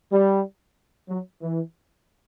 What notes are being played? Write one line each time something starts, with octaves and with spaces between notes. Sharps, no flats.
G3
F#3
E3